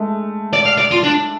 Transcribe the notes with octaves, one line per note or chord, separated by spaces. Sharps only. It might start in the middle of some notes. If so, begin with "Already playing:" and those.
Already playing: G#3 A3
D5
F5
D5
F4
D4